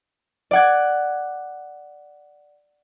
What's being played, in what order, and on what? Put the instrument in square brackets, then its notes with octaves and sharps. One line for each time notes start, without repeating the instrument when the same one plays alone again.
[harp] D5 F#5 G#6